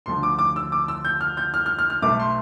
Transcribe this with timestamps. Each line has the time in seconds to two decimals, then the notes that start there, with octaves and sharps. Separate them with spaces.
0.06 D2 D3 F3 C6
0.23 D6
0.39 D6
0.56 E6
0.72 D6
0.88 E6
1.05 G6
1.21 F6
1.37 G6
1.54 F6
1.66 F6
1.79 F6
1.90 F6
2.02 B1 B2 A3 D6
2.19 C6